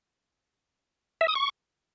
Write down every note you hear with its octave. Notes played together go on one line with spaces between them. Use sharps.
E5
D#6
C#6